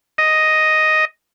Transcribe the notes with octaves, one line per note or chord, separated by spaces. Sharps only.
D#5